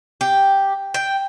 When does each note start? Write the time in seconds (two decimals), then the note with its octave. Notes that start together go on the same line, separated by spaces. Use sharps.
0.21 G4
0.94 G5